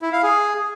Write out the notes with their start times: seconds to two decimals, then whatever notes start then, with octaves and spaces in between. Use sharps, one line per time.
0.02 E4
0.13 F5
0.23 G#4